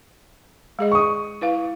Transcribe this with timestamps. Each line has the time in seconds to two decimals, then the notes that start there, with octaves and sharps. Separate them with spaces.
0.79 G#3 G#4 D#5
0.92 C#6 D#6
1.41 E4 B4 F5